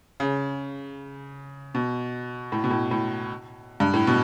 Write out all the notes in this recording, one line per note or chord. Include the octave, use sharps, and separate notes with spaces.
C#3
B2
A2
B2
A2
A2
G2
A2
B2